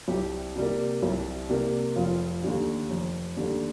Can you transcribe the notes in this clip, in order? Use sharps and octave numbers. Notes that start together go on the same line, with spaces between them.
C2 G4
C3 G3 A#3
C2
C3 G3 A#3
F1 F4
D#2 D3 G3
F1
D#2 D3 G3